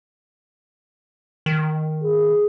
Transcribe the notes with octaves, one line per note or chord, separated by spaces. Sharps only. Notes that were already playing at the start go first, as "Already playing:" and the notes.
D#3
G#4